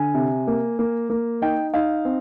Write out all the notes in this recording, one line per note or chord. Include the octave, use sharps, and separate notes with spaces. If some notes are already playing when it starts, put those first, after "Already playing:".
Already playing: D3 G#5
C3
A#3
A#3
A#3
D#4 G5
D#4 F5
C4